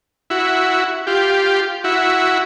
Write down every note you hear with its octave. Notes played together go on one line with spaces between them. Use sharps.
E4 F#4
F4 G4
E4 F#4